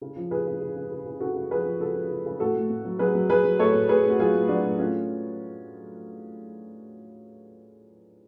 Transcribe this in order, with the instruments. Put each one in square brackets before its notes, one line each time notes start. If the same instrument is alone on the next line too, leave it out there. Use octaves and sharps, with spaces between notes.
[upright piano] C#3
F3
C#3 G#4 B4
C#3
C#3
C#3
C#3
C#3
C#3 F#4 A4
C#3
F3 G#4 B4
F3
C#3 F#4 A4
F3
C#3
C#3
A2 F#4 A4
A2
A2
F#3
F#3 G#4 B4
F#3
F#3 G#4 B4
F#3
A2 A4 C#5
A2
A2 G#4 B4
A2
F#4
F#3 F4 G#4
A2
F#3 D4 F#4
A2
A2 C#4 F4